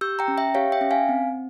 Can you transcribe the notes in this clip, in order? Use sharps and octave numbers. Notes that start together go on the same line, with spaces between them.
G4 E6 G6
G5 A#5
C#4
E5 G5
G4 C#5 F5
E5 G5
C#4
F5 G#5
C4